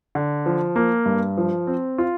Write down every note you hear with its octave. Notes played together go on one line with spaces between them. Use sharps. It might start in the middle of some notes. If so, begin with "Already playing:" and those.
D3
F3
A#3
G2
F3
C4
F4